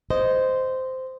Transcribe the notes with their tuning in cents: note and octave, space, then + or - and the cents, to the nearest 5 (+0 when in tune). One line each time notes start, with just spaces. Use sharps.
C5 -10 D#5 +0